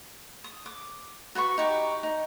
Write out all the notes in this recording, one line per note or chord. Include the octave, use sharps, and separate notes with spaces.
D#6
D6
F#4 B4 B5 C#6
D#4 G4 C#6
D#4